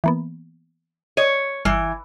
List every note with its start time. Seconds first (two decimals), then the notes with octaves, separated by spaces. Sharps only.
0.04 E3 A#3 B3
1.17 C#5 D#5
1.65 G1 E3 F6